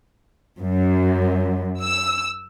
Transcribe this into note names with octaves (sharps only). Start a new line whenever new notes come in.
F#2
E6